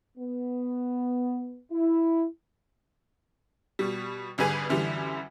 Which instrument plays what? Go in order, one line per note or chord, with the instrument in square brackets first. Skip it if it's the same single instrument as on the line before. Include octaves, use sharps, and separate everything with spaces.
[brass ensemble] B3
E4
[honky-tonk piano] B2 G3
G#1 D3 G3 G#4 B4 G#5
F#2 D3 E3 G3